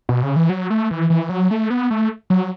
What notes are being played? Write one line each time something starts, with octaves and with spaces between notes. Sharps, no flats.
B2
C#3
E3
F#3
A3
E3
E3
F#3
A3
B3
A3
F#3